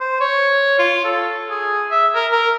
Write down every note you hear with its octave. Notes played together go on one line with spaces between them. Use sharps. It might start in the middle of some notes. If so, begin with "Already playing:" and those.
C5
C#5
F4
A4
G#4
E5
A#4
A#4